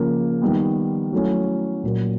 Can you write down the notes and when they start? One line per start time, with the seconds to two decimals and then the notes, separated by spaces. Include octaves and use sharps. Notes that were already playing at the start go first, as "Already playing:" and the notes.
Already playing: C#3 F3 A#3
0.42 D#3 G3 B3
1.13 F#3 A3 C#4 E4
1.83 A#2 F#3 A#3